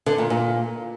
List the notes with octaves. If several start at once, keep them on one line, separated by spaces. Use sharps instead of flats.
D3
A#2
A#2